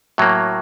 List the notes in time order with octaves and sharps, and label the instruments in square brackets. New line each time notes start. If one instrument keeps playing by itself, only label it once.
[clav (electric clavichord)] A2 F#3 A#3